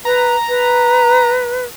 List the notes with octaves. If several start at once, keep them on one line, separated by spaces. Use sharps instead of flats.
B4 A#5
B4